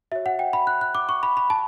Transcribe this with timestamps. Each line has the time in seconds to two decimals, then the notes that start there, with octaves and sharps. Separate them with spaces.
0.12 F#4 C#5 E5
0.26 F#5
0.39 G5
0.53 B5
0.67 F#6
0.81 F#6
0.95 D6
1.09 C#6
1.23 B5
1.37 B5
1.50 A5